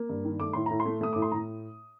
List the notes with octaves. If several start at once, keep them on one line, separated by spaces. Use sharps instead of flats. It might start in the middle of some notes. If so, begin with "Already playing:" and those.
Already playing: A#3
G2
D#3
A3 D6
A2 C6
A2 A#5
C6
A3
A3 D#6
A2 D6
C6
A2 A#5